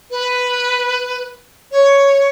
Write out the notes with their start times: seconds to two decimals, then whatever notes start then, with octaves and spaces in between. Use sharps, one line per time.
0.10 B4
1.71 C#5